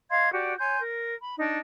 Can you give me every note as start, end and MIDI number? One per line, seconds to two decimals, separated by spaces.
0.11 0.31 75
0.11 0.31 77
0.11 0.31 84
0.11 0.31 92
0.32 0.55 66
0.32 0.55 67
0.32 0.55 74
0.32 0.55 78
0.59 0.80 73
0.59 0.80 80
0.59 0.80 84
0.59 0.80 91
0.80 1.15 70
1.21 1.36 83
1.39 1.59 62
1.39 1.59 63